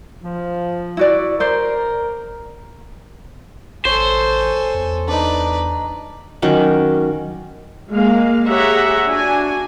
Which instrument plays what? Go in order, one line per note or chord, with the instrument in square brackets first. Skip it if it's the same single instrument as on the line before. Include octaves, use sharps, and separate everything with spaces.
[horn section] F3
[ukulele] E4 F#4 D5
[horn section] A#4 [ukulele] C5 D5
[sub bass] A1 [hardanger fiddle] A4 G#5 [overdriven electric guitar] C5 [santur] C#5
[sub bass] E2
[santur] D4 D#4 [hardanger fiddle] B4 D5
[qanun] D#3 F#3 C#4 D6
[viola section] G#3 A#3 F5
G4 G#4 C#5 E5 F#5 A#5
D4 F#4 G#5